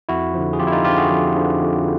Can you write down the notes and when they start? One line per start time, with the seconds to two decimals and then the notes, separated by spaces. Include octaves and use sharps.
0.09 F2 E4 F#4
0.34 D3 F3
0.53 G#4
0.59 F2 F4 G4
0.67 E4
0.72 D#4 F4
0.85 D3 F3 F4 G4
0.97 F#4 G#4
1.11 F2
1.36 D3 F3
1.62 F2